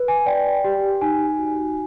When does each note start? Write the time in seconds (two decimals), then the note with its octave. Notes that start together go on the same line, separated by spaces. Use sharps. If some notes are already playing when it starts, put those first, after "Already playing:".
Already playing: B4
0.08 G#5
0.26 D5 G5
0.64 G4
1.01 D#4 G#5
1.38 F#4